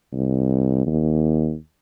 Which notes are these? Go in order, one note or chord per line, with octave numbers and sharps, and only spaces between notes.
C2
D#2